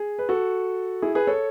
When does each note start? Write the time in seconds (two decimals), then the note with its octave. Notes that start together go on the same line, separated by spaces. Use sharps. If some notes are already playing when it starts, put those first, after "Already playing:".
Already playing: G#4
0.19 B4
0.29 F#4 A4
1.02 E4 G#4
1.15 G#4 B4
1.27 A4 C#5